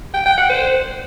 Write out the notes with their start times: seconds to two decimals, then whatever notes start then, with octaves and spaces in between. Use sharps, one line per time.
0.14 G5
0.26 G5
0.37 F#5
0.49 C5